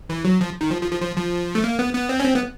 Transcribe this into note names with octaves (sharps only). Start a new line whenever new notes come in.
E3
F#3
F3
D#3
F3
F3
F3
F3
F3
A3
A#3
B3
B3
C4
C#4
C4
B3